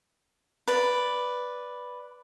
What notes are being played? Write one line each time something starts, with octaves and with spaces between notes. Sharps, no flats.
B4 D5